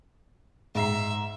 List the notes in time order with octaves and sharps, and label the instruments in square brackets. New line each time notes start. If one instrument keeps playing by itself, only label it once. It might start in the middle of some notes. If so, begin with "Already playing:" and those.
[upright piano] G#2 A#5 C7 [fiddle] E5